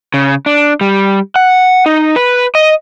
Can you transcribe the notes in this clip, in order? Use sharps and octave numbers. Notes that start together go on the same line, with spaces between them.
C#3
D4
G3
F#5
D#4
B4
D#5